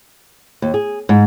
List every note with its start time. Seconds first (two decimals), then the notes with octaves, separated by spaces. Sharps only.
0.62 D#2
0.74 G#4
1.09 G#2